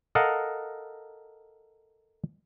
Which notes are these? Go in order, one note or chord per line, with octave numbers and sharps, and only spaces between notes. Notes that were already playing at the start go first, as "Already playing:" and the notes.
A4 A#4 D#5 F5 F#5